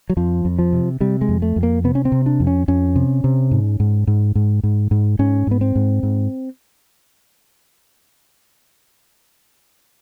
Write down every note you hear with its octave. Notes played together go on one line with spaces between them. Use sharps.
F#3
F2 F3
F2
F3
C3
C3 G3
G#3
F2
A3
F2
A#3
C3 B3
C#4
C4
C3
D4
F2
C#4
F2 C#4
C3
C3
G#2
G#2
G#2
G#2
G#2
G#2
G#2 C#4
G#2 B3
C4
G#2
G#2